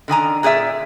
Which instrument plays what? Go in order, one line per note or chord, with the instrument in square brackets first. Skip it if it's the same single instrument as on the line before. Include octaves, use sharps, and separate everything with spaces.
[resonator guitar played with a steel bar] D3 D#3 G#5 A#5
A#2 G#4 D5 E5